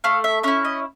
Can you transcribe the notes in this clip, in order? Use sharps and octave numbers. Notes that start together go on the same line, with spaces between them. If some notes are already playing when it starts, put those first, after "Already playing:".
A3 F5
E5
C#4 E4 E5
D#5